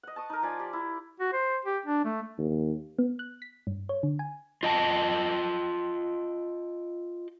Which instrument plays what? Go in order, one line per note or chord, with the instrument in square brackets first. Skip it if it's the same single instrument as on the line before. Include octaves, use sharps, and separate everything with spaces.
[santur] D#5 F#5
A5 C#6 D#6
D#4 A#4
F3 D5 G#5
G4
E4
[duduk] F#4
C5
G4
D4
A3
[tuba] D#2
[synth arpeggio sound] B3
F#6
B6
G2
C#5
D3
G#5
[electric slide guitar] F4 D#5 G5 A5